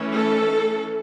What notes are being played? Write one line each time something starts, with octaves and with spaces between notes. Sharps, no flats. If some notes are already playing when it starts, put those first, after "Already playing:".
Already playing: E3 A3 C#4
A4